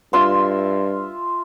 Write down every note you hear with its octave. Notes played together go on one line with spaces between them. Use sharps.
G2 F4 E5 C6